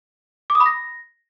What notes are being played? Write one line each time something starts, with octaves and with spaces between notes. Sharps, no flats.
D6
D#6
B5
A#6